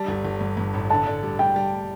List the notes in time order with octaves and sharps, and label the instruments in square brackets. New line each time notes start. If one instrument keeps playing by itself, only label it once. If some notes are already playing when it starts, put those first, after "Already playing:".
Already playing: [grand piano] G3 [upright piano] A5
[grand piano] G1
G1
G2
G2
A1
[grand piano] D3 [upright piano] A5
[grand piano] D3
G3
[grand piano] G3 [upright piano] G5
[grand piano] G3